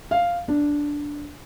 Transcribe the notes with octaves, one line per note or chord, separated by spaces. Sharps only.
F5
D4